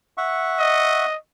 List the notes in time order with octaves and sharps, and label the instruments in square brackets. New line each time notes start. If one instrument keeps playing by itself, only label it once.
[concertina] E5 F#5 C#6
[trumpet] D#5